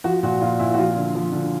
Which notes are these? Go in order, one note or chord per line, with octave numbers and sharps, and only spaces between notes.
F3 F#4
A#2 F#4
A#2 F4
A#2 E4
F#4
F3 F4
D3
F3
D3